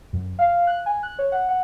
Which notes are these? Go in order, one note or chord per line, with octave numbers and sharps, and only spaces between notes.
F#2
F5
F#6
G#5
F#6
C#5
F#5
F#5